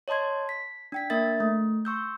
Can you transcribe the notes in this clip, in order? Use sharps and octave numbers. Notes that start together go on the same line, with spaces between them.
C#5 D#5 A5 C6 G#6
B6
D4 G5 B6
A#3 D4 A#4 E5 A6
A3
C6 C#6 E6 G6